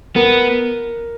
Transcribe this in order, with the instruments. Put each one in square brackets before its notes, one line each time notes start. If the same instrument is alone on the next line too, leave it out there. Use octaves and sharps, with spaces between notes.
[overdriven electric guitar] B3 [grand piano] A#4